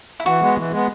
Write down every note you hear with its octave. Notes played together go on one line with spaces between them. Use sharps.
E4
E3 F#4
G#3 B3
E3
G#3 B3